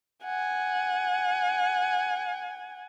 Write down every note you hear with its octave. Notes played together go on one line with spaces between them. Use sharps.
F#5 G#5